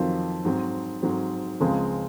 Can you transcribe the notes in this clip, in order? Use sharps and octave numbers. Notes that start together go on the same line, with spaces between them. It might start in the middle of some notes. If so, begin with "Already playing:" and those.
Already playing: F2 D#3 F#3 C4 F4
G#2 F#3 C4
G#2 F#3 C4
C#2 C#3 F3 G#3 C4